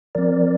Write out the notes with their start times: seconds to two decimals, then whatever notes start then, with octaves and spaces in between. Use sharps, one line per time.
0.15 F3 C4 A#4 D5